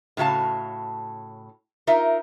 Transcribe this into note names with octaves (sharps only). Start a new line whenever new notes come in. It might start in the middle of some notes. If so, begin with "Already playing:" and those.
A2 C#3 F#4 F5 A5
D#4 F4 A#4 E5